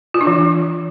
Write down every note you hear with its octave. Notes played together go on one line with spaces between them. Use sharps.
F4
D4
E3